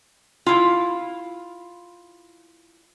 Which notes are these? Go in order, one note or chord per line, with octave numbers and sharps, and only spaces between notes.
E4 F4